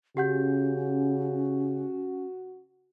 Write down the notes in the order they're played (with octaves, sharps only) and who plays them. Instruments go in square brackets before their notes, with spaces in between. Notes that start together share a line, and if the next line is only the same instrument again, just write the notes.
[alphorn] C#3 [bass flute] C#4 [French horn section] F#4 [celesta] G4 F#5 G6